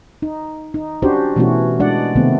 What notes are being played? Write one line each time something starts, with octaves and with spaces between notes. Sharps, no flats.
D#4
D#4
C#4 D4 F#4 G4 C5
B2 E3 A3 B3 C#4 F#4
G#3 D4 F#4 D5 F#5
C3 D#3 A3 B3 C4